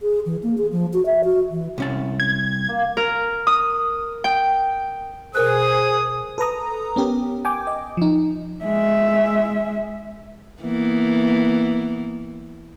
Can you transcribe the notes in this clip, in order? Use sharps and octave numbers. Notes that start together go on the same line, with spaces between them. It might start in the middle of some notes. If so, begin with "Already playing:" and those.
G#4
E3
A#3
G#4
F3
F#4
E5
F#4
E3
C2 C#4 A5
G#6
A#3
A#4
D#6
G5
B2 G#4 A#4 C5 D#6 F#6
A4 B4 A#5 D#6
B3 C#4 G4 A#4
G5 G#5 D6
D#5
F3 D#4
G#3 E5
E3 A#3 B3